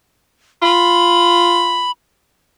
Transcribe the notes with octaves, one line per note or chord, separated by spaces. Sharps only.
F4 B5